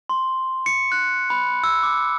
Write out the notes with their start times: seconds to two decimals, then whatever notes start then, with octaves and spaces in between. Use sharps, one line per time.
0.09 C6
0.66 C#7
0.92 F#6
1.30 B5
1.64 E6
1.83 D6